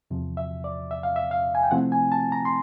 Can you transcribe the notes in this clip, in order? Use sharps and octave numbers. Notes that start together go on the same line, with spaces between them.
E2 C3 F3
E5
D5
E5
F5
E5
F5
G#5
G5
C3 F3 A3 C4 E4 F#5
G#5
A5
A#5
C6